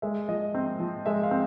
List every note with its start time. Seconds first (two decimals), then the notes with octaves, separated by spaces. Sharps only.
0.02 G#3 E5
0.28 F3 D#5
0.54 C4
0.80 F3
1.06 G#3 E5
1.23 F5
1.31 C4